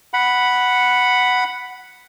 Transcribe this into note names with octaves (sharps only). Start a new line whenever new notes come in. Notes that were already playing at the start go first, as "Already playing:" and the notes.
F#5 B5